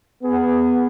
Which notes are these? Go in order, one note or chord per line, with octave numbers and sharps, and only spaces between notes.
B3 G#4